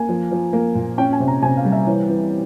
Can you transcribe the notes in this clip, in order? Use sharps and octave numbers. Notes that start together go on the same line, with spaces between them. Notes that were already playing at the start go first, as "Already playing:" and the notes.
Already playing: A#3 G#5
F3
F3
A#3
A#2
C#4 G5
G#5
C3
A#5
C3 G#5
F5
G3
E5
E3 C#5
E3